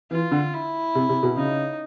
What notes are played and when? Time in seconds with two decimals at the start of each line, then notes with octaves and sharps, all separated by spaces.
0.11 E3 F4
0.32 D3
0.54 E4
0.95 C3
1.09 C3
1.23 B2
1.37 C#3 D#4